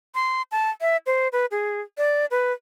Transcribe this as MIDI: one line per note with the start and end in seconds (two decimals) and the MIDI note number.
0.15 0.42 84
0.52 0.70 81
0.81 0.97 76
1.06 1.28 72
1.32 1.46 71
1.51 1.81 68
1.98 2.26 74
2.31 2.53 71